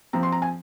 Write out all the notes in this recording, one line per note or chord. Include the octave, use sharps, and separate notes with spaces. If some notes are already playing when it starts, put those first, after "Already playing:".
F3 C4 A#5
C6
A#5
G#5